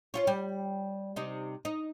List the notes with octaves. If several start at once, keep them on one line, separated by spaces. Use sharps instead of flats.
C#4 F4 C#5
G3
C3 D#4
D#4